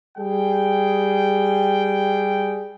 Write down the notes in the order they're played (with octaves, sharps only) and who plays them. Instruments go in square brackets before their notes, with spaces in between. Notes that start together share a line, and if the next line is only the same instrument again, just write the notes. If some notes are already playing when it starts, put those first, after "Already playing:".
[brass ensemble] G3 G#4 G5